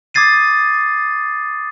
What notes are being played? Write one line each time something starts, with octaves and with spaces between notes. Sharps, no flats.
D6 D#6 G#6 A6 C7 D#7